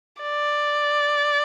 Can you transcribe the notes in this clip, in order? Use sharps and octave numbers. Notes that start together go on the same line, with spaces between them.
D5